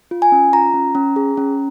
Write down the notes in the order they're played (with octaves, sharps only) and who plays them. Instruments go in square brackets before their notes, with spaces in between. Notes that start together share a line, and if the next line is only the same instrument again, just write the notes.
[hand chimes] F4
G#5
C#4
F4 A#5
C#4
C#4
G#4
C#4